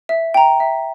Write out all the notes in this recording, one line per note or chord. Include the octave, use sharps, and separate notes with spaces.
E5
G5 A#5
E5